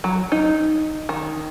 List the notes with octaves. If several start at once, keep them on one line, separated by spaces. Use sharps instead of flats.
F#3
D#4
D#3